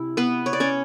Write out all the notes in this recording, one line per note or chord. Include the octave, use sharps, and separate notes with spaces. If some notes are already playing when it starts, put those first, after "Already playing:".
Already playing: C3 G#3 E4
B3 B4
C#5
D5
C#4 C#5